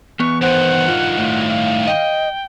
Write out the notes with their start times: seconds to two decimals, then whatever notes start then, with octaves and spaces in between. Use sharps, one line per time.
0.19 E2 B3 C#6
0.42 G2 D#3 C5 F#5
0.88 F4
1.18 A2 E4 F4
1.49 F5
1.87 D#5 G5